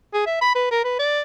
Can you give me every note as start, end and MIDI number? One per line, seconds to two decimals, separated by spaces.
0.14 0.24 68
0.26 0.40 76
0.41 0.51 83
0.55 0.71 71
0.71 0.83 70
0.84 0.98 71
0.99 1.22 74